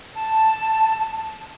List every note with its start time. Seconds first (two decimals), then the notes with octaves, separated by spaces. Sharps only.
0.14 A5